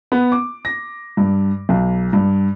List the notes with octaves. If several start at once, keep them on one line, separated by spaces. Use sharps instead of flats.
B3
D6
A#6
G2
B1
G2